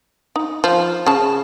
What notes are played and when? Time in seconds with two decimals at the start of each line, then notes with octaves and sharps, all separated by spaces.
0.36 D#4
0.64 F3
1.06 C#3 A5